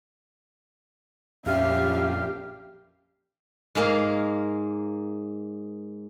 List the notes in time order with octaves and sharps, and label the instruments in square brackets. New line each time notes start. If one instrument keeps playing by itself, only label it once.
[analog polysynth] A#1 G4 [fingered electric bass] F2 C#4 [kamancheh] E5 [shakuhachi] F5
[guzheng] G#2 G#3 A#3 A#4 F5